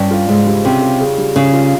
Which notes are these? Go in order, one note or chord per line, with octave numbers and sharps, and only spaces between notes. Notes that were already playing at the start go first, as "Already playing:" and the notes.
Already playing: G2 C#4
F4
G#2 C#3
G3
C3 C#4
F4
C#3
G3
C#3 C#4
F4